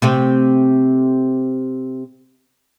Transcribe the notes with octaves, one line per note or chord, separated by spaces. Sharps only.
C3 A3 C4